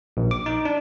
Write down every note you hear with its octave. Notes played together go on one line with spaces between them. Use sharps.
A#1
D6
D#4
D4